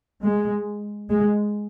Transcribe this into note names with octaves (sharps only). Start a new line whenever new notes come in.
G#3
G#3